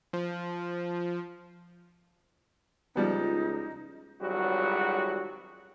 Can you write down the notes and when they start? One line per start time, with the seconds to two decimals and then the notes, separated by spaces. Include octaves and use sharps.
0.13 F3
2.96 C#2 F3 G3 B3 D#4
4.22 G#1 C#2 F#3 G3 F#4